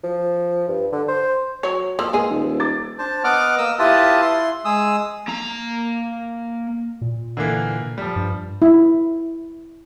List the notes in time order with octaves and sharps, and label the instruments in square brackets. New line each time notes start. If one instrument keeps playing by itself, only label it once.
[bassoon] F3
G2
D3
C5
[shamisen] F#3 C#5
[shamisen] F3 A#3 [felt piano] E6
[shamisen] G#3 G#4 [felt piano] A#3 A#4 B4
[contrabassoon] D#1
[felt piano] D6 A6
[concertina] D4 C5 A5
B3 D#5 F#5 D6 F6
A#3 D#5 D#6 E6
E4 F4 G4 B4 A5 D#6
E4 C6
G#3 G#4 D#6 E6
[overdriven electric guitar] A#3 A#5
[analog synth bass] A#2
[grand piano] D3 E3 A#3
F3 G3
[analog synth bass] G2
[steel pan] E4